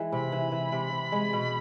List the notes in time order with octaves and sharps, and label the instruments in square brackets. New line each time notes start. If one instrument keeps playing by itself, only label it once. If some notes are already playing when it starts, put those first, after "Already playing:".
Already playing: [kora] E3 G#3
[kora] C3 [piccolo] B5
[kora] E3
E3
C3
C3
G#3
B2